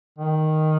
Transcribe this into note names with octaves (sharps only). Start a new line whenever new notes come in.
D#3